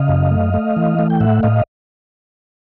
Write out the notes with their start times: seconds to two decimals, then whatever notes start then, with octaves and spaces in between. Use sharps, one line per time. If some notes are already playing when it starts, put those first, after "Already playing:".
Already playing: C#3 D#5 F5
0.09 F#2
0.31 A3
0.54 A3
0.76 E3
0.99 A3
1.10 G5
1.20 A2 E5 F#5
1.43 A2 D#5 F5